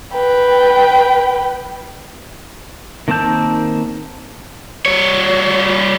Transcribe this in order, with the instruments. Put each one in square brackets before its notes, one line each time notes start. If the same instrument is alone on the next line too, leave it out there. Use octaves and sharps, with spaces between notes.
[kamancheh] B4 G5
[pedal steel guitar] D#3 A#3 C4 A5 G6
[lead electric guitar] G3 C#5